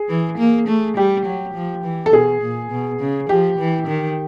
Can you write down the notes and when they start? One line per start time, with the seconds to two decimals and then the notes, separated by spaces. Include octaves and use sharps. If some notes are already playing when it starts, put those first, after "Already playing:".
Already playing: G#4
0.09 E3
0.38 A#3
0.68 A3
0.97 G3 G4
1.25 F#3
1.54 F3
1.84 E3
2.06 A4
2.12 B2 G#4
2.42 A#2
2.71 B2
3.00 C#3
3.29 F3 G4
3.58 E3
3.87 D#3